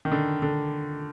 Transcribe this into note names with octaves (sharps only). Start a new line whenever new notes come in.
D#3
D3
D3